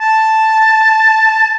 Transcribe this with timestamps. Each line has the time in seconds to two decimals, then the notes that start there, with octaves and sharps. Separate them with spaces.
0.01 A5